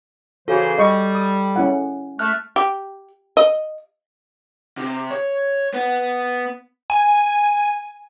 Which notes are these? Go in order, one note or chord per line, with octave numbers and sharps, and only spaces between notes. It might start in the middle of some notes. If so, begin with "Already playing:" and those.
C#3 E3 F#4 A4 C5
G3 D#5 C#6 D6
D#6
C#4 E4 F#5
A3 F6 F#6
G4
D#5
C3
C#5
B3
G#5